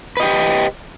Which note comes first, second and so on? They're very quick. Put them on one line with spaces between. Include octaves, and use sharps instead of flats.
B4 D#5 G4